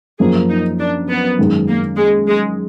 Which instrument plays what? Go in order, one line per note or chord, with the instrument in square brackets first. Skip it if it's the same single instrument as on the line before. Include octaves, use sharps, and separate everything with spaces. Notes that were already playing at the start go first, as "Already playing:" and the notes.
[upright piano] F#2 F3 A#3 [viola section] G#4
[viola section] D#4
D4
B3
[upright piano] F#2 D#3 G#3
[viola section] A#3
G#3
G#3